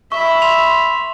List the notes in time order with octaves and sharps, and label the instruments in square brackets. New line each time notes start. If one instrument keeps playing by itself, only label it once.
[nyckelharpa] E5 B5 [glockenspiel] C#6
[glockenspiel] C6 F7